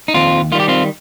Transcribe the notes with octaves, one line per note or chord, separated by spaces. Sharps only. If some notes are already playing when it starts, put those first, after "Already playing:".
D#4
D#2 C4 F4
D#3 G3 F4
G4
C4 F4